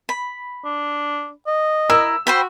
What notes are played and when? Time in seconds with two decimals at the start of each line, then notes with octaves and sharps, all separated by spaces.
0.09 B5
0.65 D4
1.47 D#5
1.90 E4 A#4 E6
2.27 F#4 C5 G5 B5